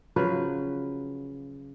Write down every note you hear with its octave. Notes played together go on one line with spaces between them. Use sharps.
C#3 F3 F#3 B4